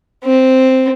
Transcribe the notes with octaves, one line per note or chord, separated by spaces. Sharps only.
C4